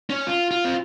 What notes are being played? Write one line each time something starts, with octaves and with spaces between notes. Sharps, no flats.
C#4
F4
F4
C4